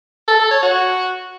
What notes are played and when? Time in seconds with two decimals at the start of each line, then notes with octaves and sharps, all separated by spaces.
0.28 A4
0.39 A4
0.51 C#5
0.63 F#4